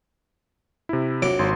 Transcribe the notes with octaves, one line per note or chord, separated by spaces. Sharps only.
C3 E4
A#1 F#3 D6
G#1 C6